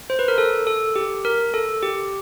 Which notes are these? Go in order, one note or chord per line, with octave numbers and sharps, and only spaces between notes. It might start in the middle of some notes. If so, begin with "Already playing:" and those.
C5
B4
A#4
A4
A4
G4
A#4
A4
G4